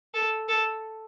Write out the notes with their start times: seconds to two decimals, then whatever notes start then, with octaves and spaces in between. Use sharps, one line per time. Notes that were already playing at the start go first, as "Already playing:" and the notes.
0.14 A4
0.48 A4